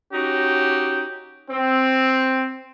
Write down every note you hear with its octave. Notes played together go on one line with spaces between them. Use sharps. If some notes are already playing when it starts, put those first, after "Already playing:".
C#4 D#4 F#4 G4
C4